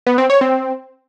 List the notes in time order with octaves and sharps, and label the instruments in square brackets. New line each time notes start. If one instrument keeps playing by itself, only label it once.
[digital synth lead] B3
C4
C#5
C4